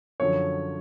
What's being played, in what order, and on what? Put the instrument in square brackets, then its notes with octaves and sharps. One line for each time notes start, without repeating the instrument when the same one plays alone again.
[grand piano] F#2 D3 F3 C#5